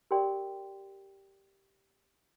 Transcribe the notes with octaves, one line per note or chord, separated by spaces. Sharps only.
G4 A#4 D5 G5 C6